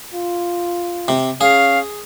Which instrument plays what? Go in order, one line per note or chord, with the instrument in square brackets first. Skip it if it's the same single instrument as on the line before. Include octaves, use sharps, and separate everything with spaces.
[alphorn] F4
[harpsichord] C3
[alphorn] C#4 [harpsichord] G#4 [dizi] F5